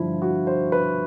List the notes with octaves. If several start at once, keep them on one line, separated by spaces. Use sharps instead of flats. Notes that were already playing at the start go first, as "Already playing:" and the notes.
Already playing: G2 D3 F3 E4 F4
F#4
C5
B4